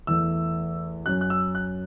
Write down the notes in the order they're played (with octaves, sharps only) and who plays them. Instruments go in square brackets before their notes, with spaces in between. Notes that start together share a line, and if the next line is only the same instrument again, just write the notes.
[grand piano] E2 E3 A3 E6
F#2 F#3 C#4 F#6
F#6
E6
F#6